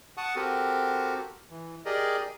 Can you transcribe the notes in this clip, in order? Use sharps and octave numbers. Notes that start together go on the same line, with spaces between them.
F#5 A5 C#6 D#6
C4 F#4 G4 A4 A#4
E3
G4 G#4 A#4 D5 D#5